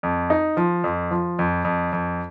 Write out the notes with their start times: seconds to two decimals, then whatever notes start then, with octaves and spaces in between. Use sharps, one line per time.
0.03 F2
0.30 D#4
0.57 F3
0.84 F2
1.11 F3
1.39 F2
1.64 F2
1.93 F2